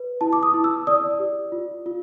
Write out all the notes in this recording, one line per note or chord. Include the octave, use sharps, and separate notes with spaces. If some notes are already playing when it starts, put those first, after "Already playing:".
Already playing: B4
E4 A5
D6
D#6
E4
E6
D5 D#6
G4
F4
F4